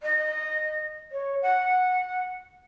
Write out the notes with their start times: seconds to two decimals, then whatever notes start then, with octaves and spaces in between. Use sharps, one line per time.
0.03 D#5
1.12 C#5
1.42 F#5